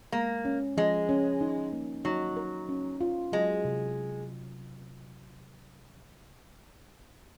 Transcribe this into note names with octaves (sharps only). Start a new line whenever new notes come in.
G#3 A#3
C#4
F3 G#3
C#4
D#4
A#3
F#3 D#4
A#4
C#4
F4
F#3 G#3
C3